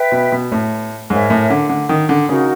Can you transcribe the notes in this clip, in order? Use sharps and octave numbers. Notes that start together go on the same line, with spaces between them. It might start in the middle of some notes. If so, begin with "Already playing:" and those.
Already playing: B4 E5 G5
B2
B2
A2
G#2 A#4 C#5 E5 G#5
A2
D3
D3
D#3
D3
C#3 D#4 F#4 A#4